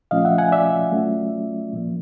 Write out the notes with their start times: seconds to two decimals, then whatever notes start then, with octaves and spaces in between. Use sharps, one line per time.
0.11 A#2 F3 A3 C#4 F4 D#5 F5
0.25 E5 F#5
0.38 F#5 G#5
0.52 D5 E5
0.92 F#3 A3 C#4 F4
1.73 A#2 F3 A#3